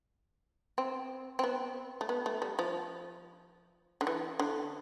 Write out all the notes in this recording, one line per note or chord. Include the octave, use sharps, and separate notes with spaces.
C4
C4
B3
A3
B3
A3
G3
F3
D3
E3
D3